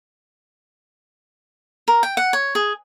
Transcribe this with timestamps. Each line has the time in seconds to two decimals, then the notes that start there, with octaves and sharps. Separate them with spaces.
1.88 A#4
2.03 G5
2.17 F#5
2.33 C#5
2.55 G#4